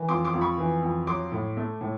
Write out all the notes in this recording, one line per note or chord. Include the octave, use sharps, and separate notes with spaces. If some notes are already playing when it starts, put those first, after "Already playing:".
Already playing: E3
F2 C6 D6
C6 D6
F2
B5 C#6
E3
F2
F#3 C6 D6
A2
A3
A2